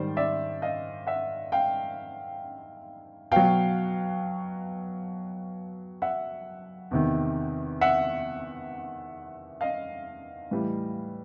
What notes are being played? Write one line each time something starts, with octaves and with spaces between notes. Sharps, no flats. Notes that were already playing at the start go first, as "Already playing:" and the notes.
Already playing: G#2 D#3 G3 C5 D5
D5 E5
D#5 F5
E5 F#5
F5 G5
B2 F#3 F5 G5
E5 F#5
E2 C3 D#3
E5 F#5
D#5 F5
A2 E3 G3